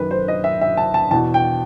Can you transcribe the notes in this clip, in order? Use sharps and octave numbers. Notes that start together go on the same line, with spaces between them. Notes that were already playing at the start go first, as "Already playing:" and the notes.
Already playing: F#2 D#3 B4
C5
D#5
E5
E5
A5
A5
E2 B2 A5
G5